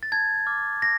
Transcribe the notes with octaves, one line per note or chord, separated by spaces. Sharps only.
A6
A5 G#6
D6 F6
A#6